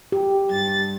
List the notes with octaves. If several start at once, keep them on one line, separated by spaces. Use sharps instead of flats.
G4
G2 A6